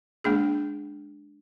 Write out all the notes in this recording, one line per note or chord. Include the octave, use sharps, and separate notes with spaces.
G#3 A#3 D4 G#4